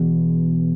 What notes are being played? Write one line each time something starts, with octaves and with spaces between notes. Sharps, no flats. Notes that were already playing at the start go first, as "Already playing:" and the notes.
Already playing: E1 E2 B2